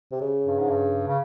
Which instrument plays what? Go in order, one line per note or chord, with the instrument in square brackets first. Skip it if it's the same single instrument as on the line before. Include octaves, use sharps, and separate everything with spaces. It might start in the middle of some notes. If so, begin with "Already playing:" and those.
[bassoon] C3
C#3
[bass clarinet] G2
G#2
G2
C#3